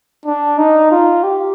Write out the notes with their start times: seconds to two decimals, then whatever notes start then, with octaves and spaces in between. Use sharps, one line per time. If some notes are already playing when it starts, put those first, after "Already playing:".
0.26 D4
0.58 D#4
0.91 F4
1.24 G4